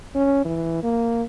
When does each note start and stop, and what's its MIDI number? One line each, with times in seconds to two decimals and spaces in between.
0.15 0.42 61
0.45 0.79 52
0.83 1.23 58